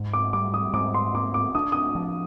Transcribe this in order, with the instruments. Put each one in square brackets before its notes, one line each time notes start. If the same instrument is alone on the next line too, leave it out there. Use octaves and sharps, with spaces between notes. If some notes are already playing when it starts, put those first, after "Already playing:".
Already playing: [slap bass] G#2
[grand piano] D6
[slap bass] G3 [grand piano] D6
[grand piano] D#6
[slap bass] G#2 [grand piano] D6
[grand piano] C6
[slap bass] A#3 [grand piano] D6
[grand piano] D6
[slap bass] D4 [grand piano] D#6
[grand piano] D#6
[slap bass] F3